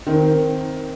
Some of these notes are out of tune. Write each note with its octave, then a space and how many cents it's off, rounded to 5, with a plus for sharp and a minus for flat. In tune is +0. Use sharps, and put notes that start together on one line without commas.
D#3 +0 C4 +0 D#4 +35